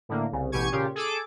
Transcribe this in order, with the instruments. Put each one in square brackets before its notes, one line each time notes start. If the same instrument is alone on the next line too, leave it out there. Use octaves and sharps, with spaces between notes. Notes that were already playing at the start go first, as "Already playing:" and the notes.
[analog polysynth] A2 D3 A#3
C2 C#3
A1 B2 G4 G#5 C#6 G#6
A#2 C#3 F4 G4
G#4 A4 D6